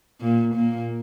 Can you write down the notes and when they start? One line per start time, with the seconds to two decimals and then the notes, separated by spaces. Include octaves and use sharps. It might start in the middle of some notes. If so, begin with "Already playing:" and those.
0.21 A#2 A#3
0.55 A#2 A#3